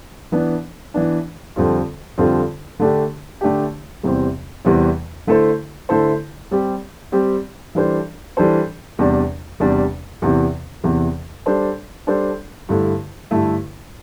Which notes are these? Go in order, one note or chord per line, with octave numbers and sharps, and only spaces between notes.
E3 B3 D4
E3 B3 D4
F2 D3 G3 C4 F4
F2 D3 G3 C4 F4
D3 A3 D4 G4
D3 A3 D4 G4
E2 C3 E3 G3 C4
E2 C3 E3 G3 C4
D3 A3 E4 A4 C5
D3 A3 E4 A4 C5
G3 C4 G4
G3 C4 G4
E3 G3 D4 A4 C5
E3 G3 D4 A4 C5
E2 C3 G3 D4
E2 C3 G3 D4
E2 C3 E3
E2 C3 E3
G3 D4 A4 C5
G3 D4 A4 C5
G2 D3 A3 E4
G2 D3 A3 E4